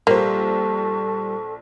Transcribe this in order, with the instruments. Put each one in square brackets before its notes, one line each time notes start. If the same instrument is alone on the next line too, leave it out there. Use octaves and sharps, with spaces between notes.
[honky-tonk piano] A#1 C5 [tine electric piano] G3 G4 [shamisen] A#3 [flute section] A4 A5 C#6